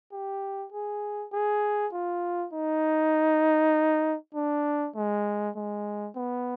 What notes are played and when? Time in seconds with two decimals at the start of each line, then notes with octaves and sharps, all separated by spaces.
0.12 G4
0.73 G#4
1.33 G#4
1.93 F4
2.53 D#4
4.35 D4
4.96 G#3
5.56 G#3
6.16 B3